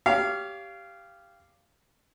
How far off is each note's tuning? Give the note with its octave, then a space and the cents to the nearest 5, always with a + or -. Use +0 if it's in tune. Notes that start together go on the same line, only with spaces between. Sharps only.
G4 +0 C#5 +30 F5 -15